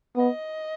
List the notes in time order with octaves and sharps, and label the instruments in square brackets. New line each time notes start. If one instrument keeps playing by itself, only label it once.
[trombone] B3 [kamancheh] D#5